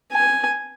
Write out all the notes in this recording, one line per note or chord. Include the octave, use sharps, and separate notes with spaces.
G#5